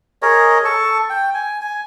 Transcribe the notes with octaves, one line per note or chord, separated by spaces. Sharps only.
G#4 A#4 C#5 D#5
A4 A5 C#6
G5
G#5
G#5